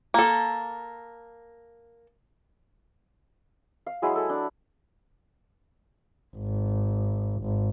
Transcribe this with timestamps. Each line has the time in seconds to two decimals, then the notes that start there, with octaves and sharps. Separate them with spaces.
0.14 A#3 A4
3.86 F5
4.02 F#3 G#3 E4 G#4
4.15 A4
4.29 D4
6.36 G#1
7.41 G#1